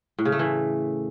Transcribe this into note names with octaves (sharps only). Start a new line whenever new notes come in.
A2
C#3
A3
E3